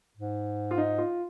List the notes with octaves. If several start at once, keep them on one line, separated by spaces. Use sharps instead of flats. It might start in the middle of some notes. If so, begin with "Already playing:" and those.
G#2
F4
D#4
F4